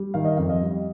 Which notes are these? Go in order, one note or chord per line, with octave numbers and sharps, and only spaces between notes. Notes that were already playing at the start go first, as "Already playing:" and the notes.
Already playing: G3
D#3 F5
D#5
F2 F5
D#5
G3